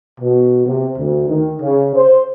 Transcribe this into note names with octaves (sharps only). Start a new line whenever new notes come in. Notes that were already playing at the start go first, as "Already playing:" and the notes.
B2
C3
D2
D#3
C#3
C5